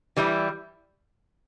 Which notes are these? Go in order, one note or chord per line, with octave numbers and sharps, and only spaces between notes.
E3 G3 E4